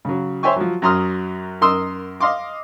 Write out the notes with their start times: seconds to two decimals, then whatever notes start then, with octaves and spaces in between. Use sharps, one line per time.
0.05 C#3 F#3
0.43 C5 C#5 E5 G5 G#5 C#6
0.56 F3 F#3
0.82 F#2 F#3 A#5 C6 D#6 F6
1.61 F#2 A#4 C6 D#6 E6
2.20 D#5 F5 C6 D6